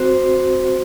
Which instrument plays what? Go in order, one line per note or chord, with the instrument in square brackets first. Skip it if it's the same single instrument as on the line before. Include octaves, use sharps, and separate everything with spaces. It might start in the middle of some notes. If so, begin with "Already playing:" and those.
Already playing: [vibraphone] C4 F#4 C5